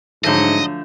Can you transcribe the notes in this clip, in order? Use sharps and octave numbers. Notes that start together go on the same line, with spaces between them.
G#2 D3 F3 F#3 A3 D#5